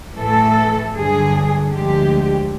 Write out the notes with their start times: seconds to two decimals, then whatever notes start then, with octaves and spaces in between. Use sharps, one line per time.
0.19 A2 E3 A3 A4
0.95 G2 D3 F#3 G#4
1.72 D2 D3 F3 G#3 G4